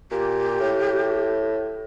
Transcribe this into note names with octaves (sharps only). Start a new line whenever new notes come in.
A#2 G4
A2